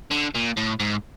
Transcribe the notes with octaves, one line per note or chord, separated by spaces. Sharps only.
D3
A#2
A2
G#2